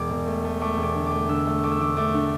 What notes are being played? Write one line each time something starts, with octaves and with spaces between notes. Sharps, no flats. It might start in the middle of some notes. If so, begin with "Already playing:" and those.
Already playing: E1 D6
E1
A3
A3
A3 D6
E1
D6
D3
D6
A3
D3 E6
A3
A3 D6
E6
D3 D6
A3 D6
D3